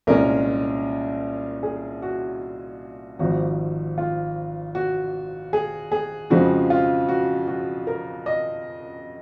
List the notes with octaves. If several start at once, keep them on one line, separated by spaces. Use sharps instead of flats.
C2 A#2 G#3 C#4 A#4
G#4
F#4
G#1 G#2 F3 F#4
F4
F#4
G#4
G#4
F2 C#3 F3 G#3 F#4
F4
F#4
F#4
A#4
D#5